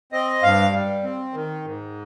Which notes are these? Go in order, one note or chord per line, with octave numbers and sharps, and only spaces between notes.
C4 D#5
G2 F5
G3
C4
D#3
G#2